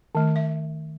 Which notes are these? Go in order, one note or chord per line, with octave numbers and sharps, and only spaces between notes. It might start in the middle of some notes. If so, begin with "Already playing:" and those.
D#3 A3
E5